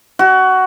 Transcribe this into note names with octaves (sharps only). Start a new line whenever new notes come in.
F#4